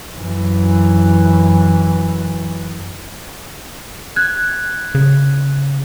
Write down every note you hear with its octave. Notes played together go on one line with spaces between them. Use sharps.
F#2 E3
F#6 G#6
C#3